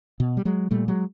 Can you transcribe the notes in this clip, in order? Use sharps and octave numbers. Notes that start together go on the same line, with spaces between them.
B2
G3
F#3 G#3
A#2 G3 A3
F#3 G#3